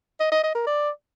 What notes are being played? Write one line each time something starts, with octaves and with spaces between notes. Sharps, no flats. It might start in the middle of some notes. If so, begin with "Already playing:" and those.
D#5
D#5
D#5
A#4
D5